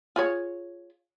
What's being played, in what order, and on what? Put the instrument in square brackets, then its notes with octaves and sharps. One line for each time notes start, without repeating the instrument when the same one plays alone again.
[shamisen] F4 G#4 C#5